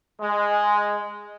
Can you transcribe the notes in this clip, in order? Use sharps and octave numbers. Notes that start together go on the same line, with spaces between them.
G#3